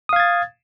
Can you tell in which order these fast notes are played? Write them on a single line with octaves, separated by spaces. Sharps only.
D#6 F5 G#6 A6